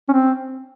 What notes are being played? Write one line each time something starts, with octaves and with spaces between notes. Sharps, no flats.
C#4
C4